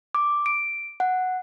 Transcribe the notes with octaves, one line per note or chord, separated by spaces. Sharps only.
D6
D7
F#5